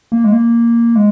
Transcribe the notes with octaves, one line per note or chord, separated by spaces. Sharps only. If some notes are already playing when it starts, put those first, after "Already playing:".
A#3
G#3
A#3
G#3